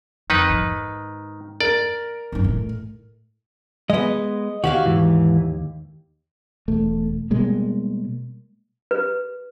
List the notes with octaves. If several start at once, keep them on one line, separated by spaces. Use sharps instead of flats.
F2 D#3 D#4 B4
G#2
A#4 D5
G#1 F#2
A2 A3
G#3 B3 D#5
D#2 F#4 G4 F5
G#2 E3
E1 A3
B2 G3 G#3 A#3
B4